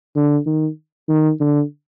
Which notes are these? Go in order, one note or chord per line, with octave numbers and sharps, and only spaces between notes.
D3
D#3
D#3
D3